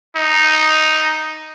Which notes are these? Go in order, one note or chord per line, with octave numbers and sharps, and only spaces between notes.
D#4